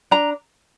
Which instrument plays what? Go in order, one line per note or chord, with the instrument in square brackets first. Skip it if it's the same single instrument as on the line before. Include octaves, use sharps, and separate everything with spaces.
[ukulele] D4 A#5